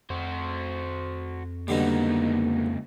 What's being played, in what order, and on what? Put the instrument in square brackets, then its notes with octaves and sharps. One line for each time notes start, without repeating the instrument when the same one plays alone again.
[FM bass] F2 [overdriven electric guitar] F#4 C5
[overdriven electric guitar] C#2 D#4 [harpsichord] B2 D3 G3 [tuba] A#3